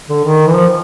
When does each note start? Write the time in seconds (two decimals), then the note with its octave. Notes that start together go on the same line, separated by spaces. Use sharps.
0.09 D3
0.25 D#3
0.47 E3
0.55 F3